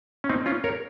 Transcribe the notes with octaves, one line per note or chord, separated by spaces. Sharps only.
C#4
C4 D#4
C#4 F4
A#4 C#5